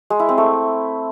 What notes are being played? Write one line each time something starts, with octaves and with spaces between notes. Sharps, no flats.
G#3
E4
C4
A3